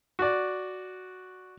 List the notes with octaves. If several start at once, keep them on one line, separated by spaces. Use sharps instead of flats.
F#4 D5